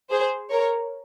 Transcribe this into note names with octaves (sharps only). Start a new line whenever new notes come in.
G#4 C5
A#4 C#5